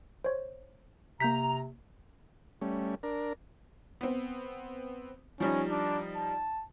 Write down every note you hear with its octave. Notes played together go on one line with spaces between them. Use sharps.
C5 C#5
C3 A#3 A#5 G6 B6
G3 A3 C#4
D4 A#4
B3 C4
F3 G3 C#4 D#4
D4
A5